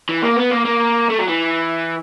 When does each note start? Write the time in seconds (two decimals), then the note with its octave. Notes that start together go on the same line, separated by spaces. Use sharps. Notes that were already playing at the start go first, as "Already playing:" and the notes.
0.09 E3
0.23 A#3
0.37 B3
0.51 A#3
0.66 A#3
1.10 A3
1.19 F#3
1.28 E3